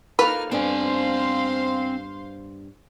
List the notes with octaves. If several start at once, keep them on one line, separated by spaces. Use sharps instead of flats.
A#3 D#4 F4 A4 B4 F6
G2 B3 C4 D4 C5 F5 G#5 C6